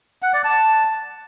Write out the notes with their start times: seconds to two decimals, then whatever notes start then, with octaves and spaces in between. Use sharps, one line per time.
0.22 F#5
0.33 D5
0.45 A5